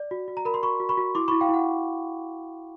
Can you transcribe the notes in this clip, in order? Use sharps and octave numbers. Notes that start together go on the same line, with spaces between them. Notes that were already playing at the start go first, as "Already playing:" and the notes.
Already playing: D5
F#4
F#4
A#5
A#4 B5
C6
F#4 B5 C#6
F#4
B5 C#6
F#4
E4 C6 D6
B5 C#6
E4
F5 G5
E4 F#5